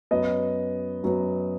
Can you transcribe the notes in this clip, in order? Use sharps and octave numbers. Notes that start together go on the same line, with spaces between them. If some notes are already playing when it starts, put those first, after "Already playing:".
F#2 F#3 B3 D#5
F#2 F#3 B3